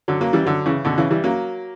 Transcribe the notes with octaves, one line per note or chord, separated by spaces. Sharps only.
D3 F#3
F#3 A#3
E3 G3
D3 F#3
C#3 E3
B2 D3
C#3 E3
E3 G3
F#3 A#3